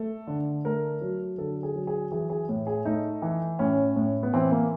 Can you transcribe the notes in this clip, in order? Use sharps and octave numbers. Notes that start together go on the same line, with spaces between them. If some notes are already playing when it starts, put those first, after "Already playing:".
Already playing: A3 A4
D3
A3 A#4
F#3
D3 A4
G#4
F#3
G#4
E3 G#4
G#4
A2
G#4
A3 D#4
E3
A2 C#4
A2
B3
E3 C4
A#3